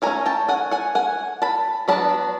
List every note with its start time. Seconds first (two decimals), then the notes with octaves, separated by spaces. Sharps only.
0.02 E3 A3 C#4 G#5 A#5
0.26 G5 A5
0.49 F#5 G#5
0.71 F#5 G#5
0.95 F#5 G#5
1.42 A5 B5
1.88 F#3 B3 D4 A5 B5